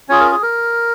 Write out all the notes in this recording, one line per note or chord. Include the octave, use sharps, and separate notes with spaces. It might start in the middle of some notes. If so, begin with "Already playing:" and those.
C#4 F4 G#4 C#5
A#4
G#4
A#4